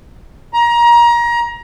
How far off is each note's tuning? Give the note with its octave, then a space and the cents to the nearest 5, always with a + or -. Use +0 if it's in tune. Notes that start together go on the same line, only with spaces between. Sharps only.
A#5 +25